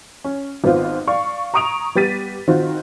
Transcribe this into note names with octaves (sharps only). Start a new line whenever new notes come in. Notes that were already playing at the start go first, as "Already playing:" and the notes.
C#4
G#1 B3 C4 F4 C5
D5 F5 C#6
A#5 C#6 D#6 D7 F7
G3 B3 G4 A6 B6 D#7
D#3 C4 F4 F#4